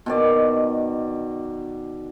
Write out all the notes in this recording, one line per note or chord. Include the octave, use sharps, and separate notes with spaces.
B2 D#3 D5